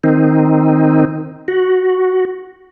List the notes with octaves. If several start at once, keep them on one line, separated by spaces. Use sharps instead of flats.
D#3 C4 D#4
F#4